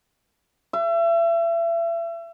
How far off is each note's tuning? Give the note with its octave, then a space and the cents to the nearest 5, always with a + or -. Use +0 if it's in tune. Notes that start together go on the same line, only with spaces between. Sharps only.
E5 +35